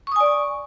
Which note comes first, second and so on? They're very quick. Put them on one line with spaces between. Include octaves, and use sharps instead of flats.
C#6 D#6 G#5 D5